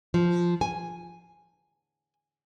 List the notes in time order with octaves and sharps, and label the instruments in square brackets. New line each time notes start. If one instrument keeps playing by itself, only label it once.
[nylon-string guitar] F3
G#5